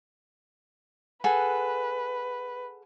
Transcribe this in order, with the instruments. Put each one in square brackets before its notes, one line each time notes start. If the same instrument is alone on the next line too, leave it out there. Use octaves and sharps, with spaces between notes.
[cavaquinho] G#4 A4 F#5 [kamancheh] B4